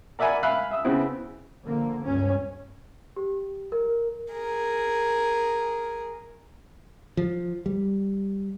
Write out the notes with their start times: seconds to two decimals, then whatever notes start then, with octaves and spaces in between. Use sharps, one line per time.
0.19 A#4 D5 E5 F#5 G#5 B5
0.43 E5 F5 G#5 B5 F6 F#6
0.71 E5 D#6 E6
0.85 C#3 B3 C4 E4
1.64 D3 F3 A#3
2.02 C#2 G2 C#4
3.16 G4
3.72 A#4
4.30 G#4 A#4
7.17 F3
7.66 G3